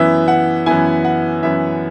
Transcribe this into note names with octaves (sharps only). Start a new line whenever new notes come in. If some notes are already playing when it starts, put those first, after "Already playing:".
Already playing: F#2 E3 B3 E4 E5
F#5
F#2 E3 B3 E4 G#5
F#5
F#2 E3 B3 E4 E5